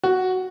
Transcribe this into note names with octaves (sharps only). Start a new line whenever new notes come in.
F#4